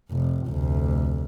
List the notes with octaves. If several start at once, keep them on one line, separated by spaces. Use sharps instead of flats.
F1
F1 D2